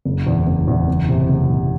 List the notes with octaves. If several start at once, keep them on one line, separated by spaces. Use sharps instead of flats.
F#1
E2
F#1
E2
F#1
C3
F#1
C3